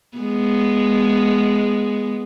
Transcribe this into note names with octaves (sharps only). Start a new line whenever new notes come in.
G#3 B3